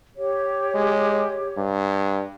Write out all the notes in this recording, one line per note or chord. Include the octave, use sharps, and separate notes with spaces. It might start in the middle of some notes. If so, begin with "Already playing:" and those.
G4 C#5
G#3
G2